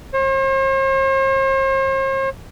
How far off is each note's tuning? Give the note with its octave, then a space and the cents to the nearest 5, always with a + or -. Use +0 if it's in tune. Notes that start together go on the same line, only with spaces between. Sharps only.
C5 +45